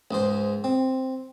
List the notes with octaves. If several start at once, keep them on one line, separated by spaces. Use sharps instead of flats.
C#2 G#2 C5
C4